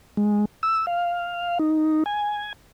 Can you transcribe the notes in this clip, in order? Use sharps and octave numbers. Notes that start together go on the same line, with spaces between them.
G#3
E6
F5
D#4
G#5